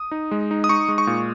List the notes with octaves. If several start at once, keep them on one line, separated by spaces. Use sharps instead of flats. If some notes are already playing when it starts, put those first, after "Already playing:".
Already playing: D#6
D#4
G#3
D#4
D#6
D#4 C#6
G#3
C#6
A#2